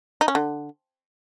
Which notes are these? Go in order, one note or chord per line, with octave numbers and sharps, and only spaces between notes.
D#4
C#4
D3